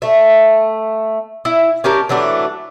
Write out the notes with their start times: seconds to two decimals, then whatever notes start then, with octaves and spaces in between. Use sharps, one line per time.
0.02 A3 E5
1.45 E4
1.84 C#4 G4 A#4 A5
2.09 E3 F#3 A3 D4